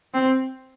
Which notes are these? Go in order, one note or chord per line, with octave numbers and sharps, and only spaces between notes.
C4